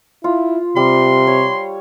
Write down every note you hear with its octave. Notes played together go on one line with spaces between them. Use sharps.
E4 F4
C3 G3 C6
C#5